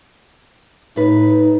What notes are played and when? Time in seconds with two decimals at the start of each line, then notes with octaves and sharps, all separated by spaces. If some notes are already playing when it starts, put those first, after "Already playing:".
0.96 A2 D#4 B4